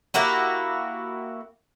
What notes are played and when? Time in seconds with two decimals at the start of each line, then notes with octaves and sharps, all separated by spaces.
0.14 A#3 E4 F#4 G4